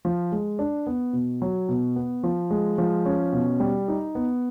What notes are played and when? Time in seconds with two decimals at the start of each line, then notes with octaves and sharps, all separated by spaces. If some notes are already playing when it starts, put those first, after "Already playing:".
0.05 F3
0.32 G#3
0.59 D4
0.87 B3
1.13 B2
1.42 F#3
1.69 B2
1.96 B3
2.23 F3
2.51 G#3
2.78 F3
3.05 C#4
3.33 B2
3.60 G3
3.88 D#4
4.15 B3